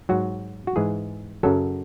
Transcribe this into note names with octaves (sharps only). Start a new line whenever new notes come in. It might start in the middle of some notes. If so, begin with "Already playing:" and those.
G#2 F#3 F#4
F#4
G#2 E3 G#3 G#4
F#2 C#3 F#3 A4